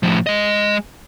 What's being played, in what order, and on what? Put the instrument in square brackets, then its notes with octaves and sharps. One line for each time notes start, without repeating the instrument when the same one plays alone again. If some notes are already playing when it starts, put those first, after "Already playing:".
[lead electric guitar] A2 F3
G#3 D#5